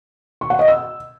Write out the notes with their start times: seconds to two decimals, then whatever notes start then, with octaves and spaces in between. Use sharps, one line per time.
0.41 C#6
0.50 F#5
0.59 D#5
0.68 E6